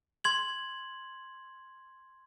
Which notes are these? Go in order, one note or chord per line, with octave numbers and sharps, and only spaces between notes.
C6 G#6 F#7